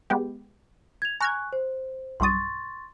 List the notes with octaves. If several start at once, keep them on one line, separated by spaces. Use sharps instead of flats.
G#3 B3 G4
G#6 F7
G#5 A#5 C#6 F6 F#6 G#6
C5
B1 G2 C6 C#6 D#6 A6